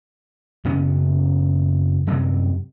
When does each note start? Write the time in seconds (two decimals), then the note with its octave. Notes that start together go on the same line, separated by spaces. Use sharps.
0.65 F#2 C#3 B3 C#4
2.07 F#2 C3 F#3 G3